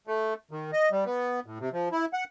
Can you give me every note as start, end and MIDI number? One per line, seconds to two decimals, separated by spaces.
0.07 0.34 57
0.51 0.71 51
0.73 0.89 75
0.92 1.04 55
1.05 1.40 59
1.46 1.58 45
1.60 1.69 48
1.73 1.89 53
1.92 2.06 64
2.13 2.24 78